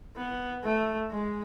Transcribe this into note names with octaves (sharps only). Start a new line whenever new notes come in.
B3
A3
G#3